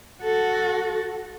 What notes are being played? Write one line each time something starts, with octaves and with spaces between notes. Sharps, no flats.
F#4 A4